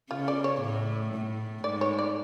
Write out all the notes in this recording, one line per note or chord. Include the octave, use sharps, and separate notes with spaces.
C#3 F4
D5
C#5
A2
A2
G#2 D5
C#5
D5